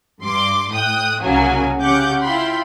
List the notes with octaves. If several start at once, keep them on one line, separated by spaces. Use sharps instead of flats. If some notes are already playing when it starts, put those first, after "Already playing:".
G2 C6 D6
A2 G5 D#6 F#6
C2 C#3 F#3 A#3 G#5
C#3 C#4 G4 F#5 D6 G6
E4 F4 G5 B5 C6